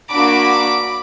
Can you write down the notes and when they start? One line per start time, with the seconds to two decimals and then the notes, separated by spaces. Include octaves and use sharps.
0.11 A#3 D4 F#4 B5 D6